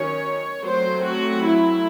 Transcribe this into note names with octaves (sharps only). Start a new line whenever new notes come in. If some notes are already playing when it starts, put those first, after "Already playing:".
Already playing: D#3 F#3 C#4 C#5
F#3 A3 C4 C5
F#4
E4